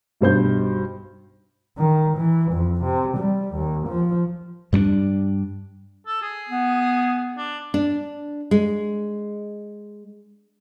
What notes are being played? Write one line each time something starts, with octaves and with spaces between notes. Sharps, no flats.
B1 G2 C5 G6
D#3
E3
F2
C3
G3
D#2
F3
G2 G3 C4 D4
A4
G#4
B3
D4
D4
G#3